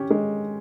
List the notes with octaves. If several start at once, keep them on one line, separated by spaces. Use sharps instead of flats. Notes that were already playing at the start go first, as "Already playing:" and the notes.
Already playing: C#4 G4
G#3